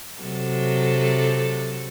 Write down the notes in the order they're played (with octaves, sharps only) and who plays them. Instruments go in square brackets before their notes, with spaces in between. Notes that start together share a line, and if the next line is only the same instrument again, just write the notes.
[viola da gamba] C3 F#3 A4